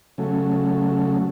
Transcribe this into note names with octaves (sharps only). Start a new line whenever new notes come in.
C#3 F#3 A3